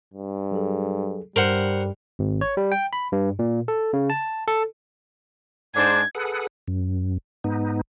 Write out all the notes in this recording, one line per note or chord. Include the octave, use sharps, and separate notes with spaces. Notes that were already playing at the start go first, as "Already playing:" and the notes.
G2
F#3 G#4 A4
G2 G3 A#4 C5 F#5
G#1
C#5
G3
G5
B5
G2
A#2
A4
C#3
A5
A4
G#2 D4 C5 G#6
G#4 A4 B4 F#5
F#2
G#2 B3 D#4